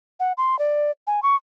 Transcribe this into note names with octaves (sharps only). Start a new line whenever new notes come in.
F#5
C6
D5
G#5
C#6